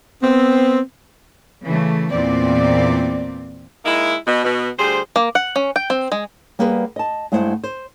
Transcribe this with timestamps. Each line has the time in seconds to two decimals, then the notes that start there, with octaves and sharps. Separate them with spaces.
0.23 B3 C4
1.64 C#3 E3 A3
2.12 E2 A#2 E3 C4 D5
3.85 G#3 A#3 D#4 E4
4.27 B2
4.44 B2
4.79 D2 G3 G#4 C5
5.16 A#3
5.35 F#5
5.56 C#4
5.76 G5
5.90 C4
6.12 G#3
6.59 G3 A#3 B3 G#4 B4
6.96 D#5 A5
7.32 G2 G#3 A3 E4 C5 F#5
7.63 C5